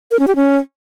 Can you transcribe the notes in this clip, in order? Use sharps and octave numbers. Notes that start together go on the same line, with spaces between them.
A#4
C#4
G4
C#4